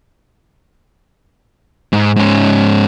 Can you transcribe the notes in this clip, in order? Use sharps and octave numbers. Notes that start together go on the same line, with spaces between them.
G#2
G#2 C#4